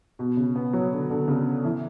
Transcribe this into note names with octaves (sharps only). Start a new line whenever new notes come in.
B2
C#3
B3
F#3
D3
D3
C#3
E3